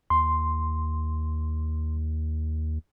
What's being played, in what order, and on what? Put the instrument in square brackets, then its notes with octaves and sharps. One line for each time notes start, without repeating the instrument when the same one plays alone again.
[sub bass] D#2 [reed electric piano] C6